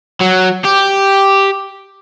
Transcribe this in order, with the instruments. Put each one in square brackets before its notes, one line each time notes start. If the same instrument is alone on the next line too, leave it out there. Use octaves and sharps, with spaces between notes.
[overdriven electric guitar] F#3
G4